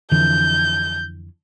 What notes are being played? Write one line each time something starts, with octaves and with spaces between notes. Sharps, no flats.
F2 D3 E3 G6